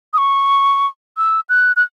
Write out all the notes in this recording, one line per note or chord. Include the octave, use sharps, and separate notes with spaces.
D#6
C#6
E6
F#6
F#6